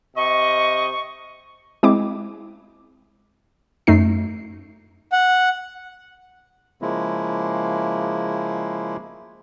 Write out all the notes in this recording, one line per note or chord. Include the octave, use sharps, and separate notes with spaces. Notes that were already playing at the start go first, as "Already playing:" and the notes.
C3 D#5 C#6
G#3 C4 E4 D6
F#2 A3 D#4 C7
F#5
C#3 F3 G#3 A#3 E4